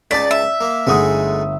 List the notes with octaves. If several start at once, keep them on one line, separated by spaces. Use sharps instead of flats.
C#2 D#4 D5 A5 B6
E5
A#3
G1 G#3 A3 D#4 F#5 D#6